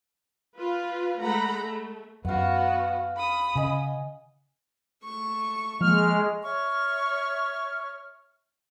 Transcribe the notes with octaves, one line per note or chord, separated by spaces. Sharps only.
F4 B4
G#3 A3 F#5 A#5 B5
A3
F#2 B3 F#4 F5 F#5
B5 D#6
C#3 D#5 G#5
A3 C#6
F3 G#3 A#3 F6
C#5 E5 C#6 F6